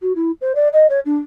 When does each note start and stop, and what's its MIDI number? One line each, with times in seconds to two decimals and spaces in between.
0.02 0.13 66
0.16 0.31 64
0.41 0.53 72
0.55 0.68 74
0.73 0.87 75
0.90 1.00 73
1.06 1.17 62